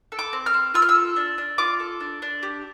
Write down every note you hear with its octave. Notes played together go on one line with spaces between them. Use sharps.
A4
D6
C4
F6
C4
F4 E6
F6
E6
A4
D4
D4
F4 D6
A4
D4
D4
G4